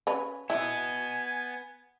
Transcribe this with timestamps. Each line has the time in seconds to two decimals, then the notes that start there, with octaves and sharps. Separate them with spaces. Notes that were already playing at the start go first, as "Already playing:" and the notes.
0.07 C#4 B4
0.50 B3 E4 D#5 G#5